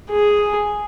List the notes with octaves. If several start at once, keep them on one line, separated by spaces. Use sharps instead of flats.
G#4